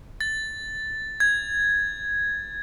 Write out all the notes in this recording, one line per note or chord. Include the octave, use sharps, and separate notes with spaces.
A6
G#6